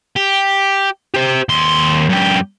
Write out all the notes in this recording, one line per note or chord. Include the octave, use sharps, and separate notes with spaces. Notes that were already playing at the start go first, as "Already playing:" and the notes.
G4
G4 C5
D#2 C6
F#2 G4